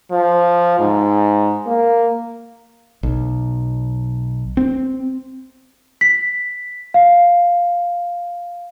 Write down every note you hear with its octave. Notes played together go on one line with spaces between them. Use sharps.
F3
G#2
A#3
B1
C4
B6
F5